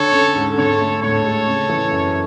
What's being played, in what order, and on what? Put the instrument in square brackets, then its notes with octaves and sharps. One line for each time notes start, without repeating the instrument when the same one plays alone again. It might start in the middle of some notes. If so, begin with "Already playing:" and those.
Already playing: [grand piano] D3 [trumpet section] A4 C#5
[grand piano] C#4
G#2
[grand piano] D3 [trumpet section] A4 C#5
[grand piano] A3
[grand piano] A2 [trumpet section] A4 C#5
[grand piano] G#3
C#3
E3
F#2